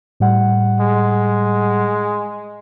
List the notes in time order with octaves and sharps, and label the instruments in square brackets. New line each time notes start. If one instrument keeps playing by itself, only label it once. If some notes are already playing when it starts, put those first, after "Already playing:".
[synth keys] A2 G3 F#5
[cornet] G#3